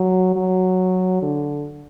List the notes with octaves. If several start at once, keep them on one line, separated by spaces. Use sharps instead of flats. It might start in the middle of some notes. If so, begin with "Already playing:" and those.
Already playing: F#3
F#3
D3